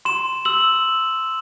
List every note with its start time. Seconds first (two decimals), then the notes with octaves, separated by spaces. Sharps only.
0.05 C6 E7
0.45 E6 F#7